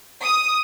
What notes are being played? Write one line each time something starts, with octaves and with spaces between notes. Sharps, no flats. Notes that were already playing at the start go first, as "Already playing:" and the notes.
D#6